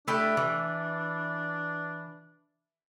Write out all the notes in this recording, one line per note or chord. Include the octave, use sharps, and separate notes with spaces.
A3 D4 E4 G4
E3